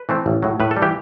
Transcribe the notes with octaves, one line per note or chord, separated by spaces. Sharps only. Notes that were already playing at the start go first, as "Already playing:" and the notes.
Already playing: B4
E3 A3 C4
A1
A2 F#3
A2 B4
A4
G3
E3 G4